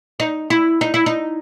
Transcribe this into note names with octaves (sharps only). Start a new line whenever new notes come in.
D#4
E4
D#4
E4
D#4